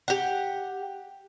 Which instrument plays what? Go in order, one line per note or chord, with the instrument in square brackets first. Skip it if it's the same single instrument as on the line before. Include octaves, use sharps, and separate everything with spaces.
[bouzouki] G4 F#5